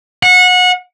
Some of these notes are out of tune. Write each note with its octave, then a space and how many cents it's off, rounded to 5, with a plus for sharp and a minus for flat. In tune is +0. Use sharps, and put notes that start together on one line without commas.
F#5 -25